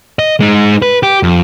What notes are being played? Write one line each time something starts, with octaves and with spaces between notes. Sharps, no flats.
D#5
G#3 D#4
B4
G4
F2